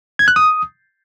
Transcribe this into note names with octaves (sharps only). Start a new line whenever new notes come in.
G#6
F#6
D#6